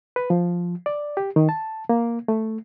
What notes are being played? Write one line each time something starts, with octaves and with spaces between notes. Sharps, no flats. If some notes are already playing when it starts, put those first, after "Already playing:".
B4
F3
D5
G4
D#3
A5
A#3
A3